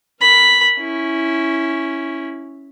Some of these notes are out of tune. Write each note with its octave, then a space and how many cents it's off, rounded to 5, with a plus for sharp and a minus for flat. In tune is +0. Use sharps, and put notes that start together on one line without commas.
A#4 +0 B5 +0
C#4 +0 E4 -5